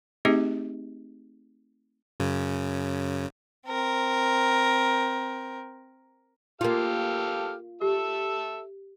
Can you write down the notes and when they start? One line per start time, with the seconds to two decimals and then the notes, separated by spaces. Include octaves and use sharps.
0.25 A3 C4 D#4 G4 G#4 D#5
2.20 F#2 C#3
3.67 C4 A#4
6.61 A#3 F4 G4 A4 F5
7.82 G4 A4 E5